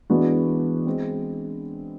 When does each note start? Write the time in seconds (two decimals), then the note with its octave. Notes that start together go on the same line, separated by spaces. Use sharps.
0.10 E3 G#3 B3 D4 F#4
0.87 G#3 C4